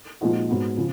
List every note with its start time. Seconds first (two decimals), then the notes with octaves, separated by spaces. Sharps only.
0.21 A#2 F3 G#3 D#4 F#4
0.48 G#2 F#3 B3 F#4
0.78 C#3 F3